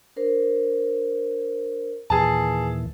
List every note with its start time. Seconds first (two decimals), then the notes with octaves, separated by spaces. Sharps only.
0.16 D4 A#4 C5
2.10 D#2 A#2 E3 G#4 B4 A5 E6